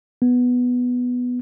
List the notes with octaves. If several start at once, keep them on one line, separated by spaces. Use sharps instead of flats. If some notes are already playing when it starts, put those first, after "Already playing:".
B3